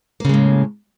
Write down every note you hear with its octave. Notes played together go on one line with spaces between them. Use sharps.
A2 C#3 G#3 A#3